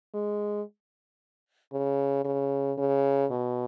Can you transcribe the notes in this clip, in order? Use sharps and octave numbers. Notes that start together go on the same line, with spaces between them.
G#3
C#3
C#3
C#3
B2